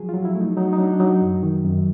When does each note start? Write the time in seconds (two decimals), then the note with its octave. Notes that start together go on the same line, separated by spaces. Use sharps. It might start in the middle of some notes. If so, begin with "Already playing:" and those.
Already playing: F3 F#3 G#4
0.09 F4
0.14 F#3
0.25 E4
0.35 A3
0.41 D#4
0.57 F#3 D#4
0.73 D#4
0.78 F#3 D4
0.94 D4
1.00 F#3 D#4
1.21 F#2
1.43 D#3
1.64 F#2